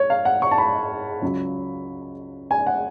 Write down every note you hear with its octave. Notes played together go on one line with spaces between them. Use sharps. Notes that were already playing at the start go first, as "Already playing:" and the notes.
Already playing: C#5
F5
F#5
C#6
A5
B5
C#2 C#3 F#3
G#5
F#5